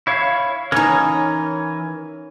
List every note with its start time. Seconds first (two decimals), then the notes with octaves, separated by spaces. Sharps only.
0.07 E4 C#5 F5
0.72 E3 C#4 D#4 A#4 C#5